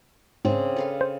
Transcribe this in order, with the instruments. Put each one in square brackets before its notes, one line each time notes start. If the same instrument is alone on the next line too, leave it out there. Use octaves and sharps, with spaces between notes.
[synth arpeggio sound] G#2 [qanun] C#3 C4 D4
[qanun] A4 B4 F5
[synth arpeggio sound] C5